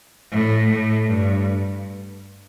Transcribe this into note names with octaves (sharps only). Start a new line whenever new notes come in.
A2
A2
G2